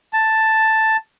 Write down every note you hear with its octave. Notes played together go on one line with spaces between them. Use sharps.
A5